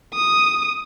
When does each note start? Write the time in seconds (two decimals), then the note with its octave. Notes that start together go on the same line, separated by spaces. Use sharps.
0.14 D#6